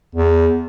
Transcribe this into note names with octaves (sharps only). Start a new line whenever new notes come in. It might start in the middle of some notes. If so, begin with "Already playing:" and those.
E2